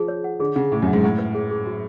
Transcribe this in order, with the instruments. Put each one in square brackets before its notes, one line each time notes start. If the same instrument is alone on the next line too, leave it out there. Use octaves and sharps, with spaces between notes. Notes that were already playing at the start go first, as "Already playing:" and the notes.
Already playing: [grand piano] F3 [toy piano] G#4
[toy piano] C#5
F#5
[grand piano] D3 [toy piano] G#4
[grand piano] C#3 [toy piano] F#5
[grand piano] A2 [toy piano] G#4
[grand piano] F#2
[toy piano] F#5
[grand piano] G#2
[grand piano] A2 [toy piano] F#5
[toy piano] B4
G#4
G#4
F#4